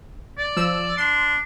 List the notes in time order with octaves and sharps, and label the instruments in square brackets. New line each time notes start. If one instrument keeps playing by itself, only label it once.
[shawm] D5
[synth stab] F3 E6
[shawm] D4 [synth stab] C6